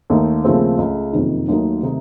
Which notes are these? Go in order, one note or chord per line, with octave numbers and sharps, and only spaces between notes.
D#2 D#3 A3 D#4
D#2 C#3 F3 A3 C4
C#2 C#3 A3
F#1 F2 C3 D#3
D#2 D#3 F#3 A3 D#4
C3 D#3 A3 D#4